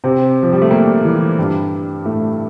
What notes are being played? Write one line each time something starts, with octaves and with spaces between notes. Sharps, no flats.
C3 C4
F3
G3
A3
A#2 A#3
E3
G2 G3
A2 A3